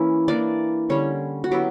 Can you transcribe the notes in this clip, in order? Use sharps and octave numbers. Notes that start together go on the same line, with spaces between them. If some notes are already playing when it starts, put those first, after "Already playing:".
Already playing: E3 A#3 C#4 E4
E3 A#3 D4 D5
D3 G3 C#4 C#5
F#4
F#3 B3 E4 G4